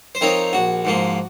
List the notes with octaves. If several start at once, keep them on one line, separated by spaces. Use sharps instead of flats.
C5
F3 C4 D#4 A#4 C#5
A#1 F#4
G#2 F3 A#3